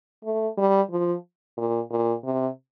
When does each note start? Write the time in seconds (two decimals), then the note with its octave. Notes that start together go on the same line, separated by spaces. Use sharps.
0.25 A3
0.58 G3
0.91 F3
1.57 A#2
1.90 A#2
2.24 C3